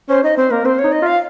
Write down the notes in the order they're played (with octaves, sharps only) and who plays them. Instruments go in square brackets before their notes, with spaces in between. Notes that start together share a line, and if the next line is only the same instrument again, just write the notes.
[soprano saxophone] C#4 [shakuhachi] C5
[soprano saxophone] D#4 [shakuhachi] D#5
[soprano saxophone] C4 [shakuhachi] C5
[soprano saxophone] A#3 [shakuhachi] A#4
[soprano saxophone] C4 [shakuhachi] C5
[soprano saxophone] D#4 [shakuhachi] C#5
[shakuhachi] D#5
[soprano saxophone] F4 [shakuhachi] F5